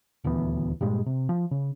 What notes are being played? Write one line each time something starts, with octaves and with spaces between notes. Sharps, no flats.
D#1 D2 E3 B3
G2 A#2 G3 G#3
C3
F3
C#3